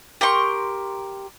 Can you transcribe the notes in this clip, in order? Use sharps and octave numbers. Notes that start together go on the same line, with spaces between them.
G4 A#4 C6 C#6